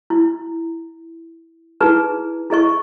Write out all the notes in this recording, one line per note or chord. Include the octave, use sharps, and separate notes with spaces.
E4
D#4 E4 G#4 B4
E4 G#4 D#5 C#6